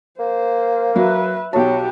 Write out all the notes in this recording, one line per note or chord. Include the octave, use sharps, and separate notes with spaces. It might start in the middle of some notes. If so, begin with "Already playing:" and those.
A#3 C5
F#3 B4 E5
B1 F#3 F#4 G4 A5